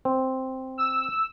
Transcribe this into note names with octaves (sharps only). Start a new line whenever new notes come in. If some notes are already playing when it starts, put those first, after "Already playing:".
C4
E6